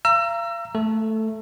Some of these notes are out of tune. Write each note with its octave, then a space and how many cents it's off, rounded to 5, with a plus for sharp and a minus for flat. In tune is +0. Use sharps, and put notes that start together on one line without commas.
F5 -40 A#5 +0 E6 +30
A3 +0 A4 +5